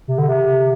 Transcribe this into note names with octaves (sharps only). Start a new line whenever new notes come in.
C3
D3
C3